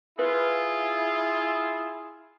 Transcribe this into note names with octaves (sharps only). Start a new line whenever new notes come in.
E4 F4 G#4 B4